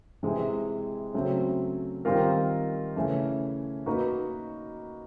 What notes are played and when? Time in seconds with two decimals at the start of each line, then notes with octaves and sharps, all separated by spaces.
0.23 C3 E3 G#3 C4
1.14 C#3 F#3 A3 C4
2.05 D#3 G3 C4 F4 A#4
2.96 C#3 E3 A3
3.86 A#3 D#4 F#4 B4